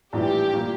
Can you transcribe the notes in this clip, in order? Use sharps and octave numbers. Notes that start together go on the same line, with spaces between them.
A#1 A2 E3 G3 D4 G4
A#2 G3 A#3